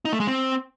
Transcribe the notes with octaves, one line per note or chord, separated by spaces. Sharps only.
D#4
A3
G#3
C4